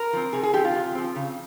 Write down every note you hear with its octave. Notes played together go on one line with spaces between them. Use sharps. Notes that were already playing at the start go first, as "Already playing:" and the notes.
Already playing: A#4
F3 C4
C3 G#4
G#4
F3 C4 G4
F4
C3
F3 C4
C#3